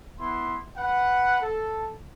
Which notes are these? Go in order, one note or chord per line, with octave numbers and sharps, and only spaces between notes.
B3 E4 C6
B4 F#5
A4